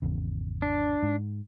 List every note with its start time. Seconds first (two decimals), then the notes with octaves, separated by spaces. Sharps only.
0.02 G#1 E2 C#3
0.62 D4
1.03 G#2